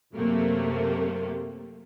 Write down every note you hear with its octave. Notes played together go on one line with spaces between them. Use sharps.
F#2 C3 A3 A#3